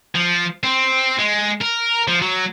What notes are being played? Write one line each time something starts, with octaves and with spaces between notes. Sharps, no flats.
F3
C4
G#3
A#4
F3
F#3